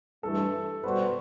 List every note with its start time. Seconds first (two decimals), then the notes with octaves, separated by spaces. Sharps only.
0.23 G2 E3 A3 A4
0.83 B2 G3 B3 F#4 B4 C5